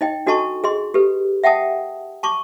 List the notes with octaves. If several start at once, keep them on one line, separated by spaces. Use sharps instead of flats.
D#4 D#5 G5
D4 F#4 A4 D#5 A5 C#6
G#4 D#5 C6
G4 A4 B4
E5 F#5 G5 A5 D#6
A5 C#6 D6